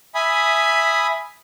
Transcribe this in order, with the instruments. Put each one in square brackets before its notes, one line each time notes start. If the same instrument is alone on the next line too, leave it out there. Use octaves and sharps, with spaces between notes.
[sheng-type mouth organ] E5 G#5 B5 D#6